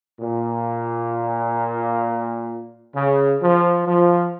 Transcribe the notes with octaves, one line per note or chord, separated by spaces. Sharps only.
A#2
C#3
F3
F3